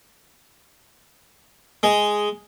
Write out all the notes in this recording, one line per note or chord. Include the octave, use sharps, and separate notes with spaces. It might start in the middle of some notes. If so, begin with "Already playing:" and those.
G#3